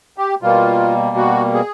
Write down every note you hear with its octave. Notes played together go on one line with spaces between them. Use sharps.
G4
B2 G3 A#3 F4
F#4
G#4